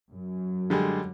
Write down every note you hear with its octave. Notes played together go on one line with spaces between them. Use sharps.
F#2 F#3
D3 G3 G#3